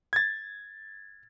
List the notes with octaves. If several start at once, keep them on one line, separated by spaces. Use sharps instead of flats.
G#6 A6